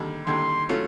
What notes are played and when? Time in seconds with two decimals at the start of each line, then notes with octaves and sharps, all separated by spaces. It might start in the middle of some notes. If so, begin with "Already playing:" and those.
Already playing: D#2 D3 G3
0.27 D#2 D3 G3 C6
0.69 F#3 A3 C#4 F4